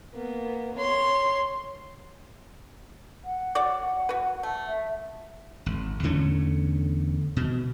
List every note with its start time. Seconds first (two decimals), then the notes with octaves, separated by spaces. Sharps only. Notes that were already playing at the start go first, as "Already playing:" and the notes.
0.15 A#3 B3
0.75 C#5 C6
3.24 F#5
3.55 F#4 C#5 D5
4.09 F#4 B4
4.43 A3
4.68 E5
5.66 G#1
6.03 E2 D3 A3 C#4
7.36 B2